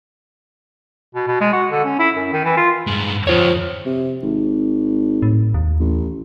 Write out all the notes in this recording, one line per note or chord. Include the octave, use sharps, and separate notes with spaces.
B2
B2
G#3
F#4
D3
C#4
E4
F#2
D#3
E3
F4
G2 G#3
F2 F4 C5 C#5
C3
G#1
A2
D#2
A1